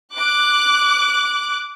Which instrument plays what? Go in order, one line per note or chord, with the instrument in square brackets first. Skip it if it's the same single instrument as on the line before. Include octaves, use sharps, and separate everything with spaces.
[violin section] D6 F#6